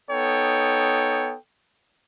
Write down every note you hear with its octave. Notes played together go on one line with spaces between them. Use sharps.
B3 D#4 A4 C#5 G5